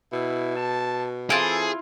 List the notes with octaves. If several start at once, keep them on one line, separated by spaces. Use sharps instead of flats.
B2 E4
A5
E3 C4 E4 F4 G#4 A4